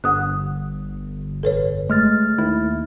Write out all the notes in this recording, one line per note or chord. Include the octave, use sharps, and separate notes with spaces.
G1 F#5 D#6 F#6
F1 A4 B4 C#5
G#3 A3 F6 A6
D#2 E4